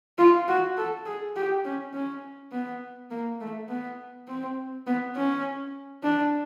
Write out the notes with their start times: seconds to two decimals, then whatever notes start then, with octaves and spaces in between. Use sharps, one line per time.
0.18 F4
0.48 F#4
0.77 A4
1.06 G#4
1.36 G4
1.65 C#4
1.94 C#4
2.52 B3
3.11 A#3
3.40 A3
3.69 B3
4.28 C4
4.87 B3
5.16 C#4
6.03 D4